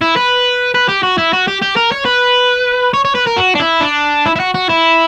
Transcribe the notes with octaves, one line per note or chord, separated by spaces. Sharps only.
E4
B4
B4
G4
F#4
E4
F#4
G4
G4
A#4
C#5
B4
C#5
C#5
B4
A#4
F#4
D4
E4
D4
E4
E4
F#4
F#4
E4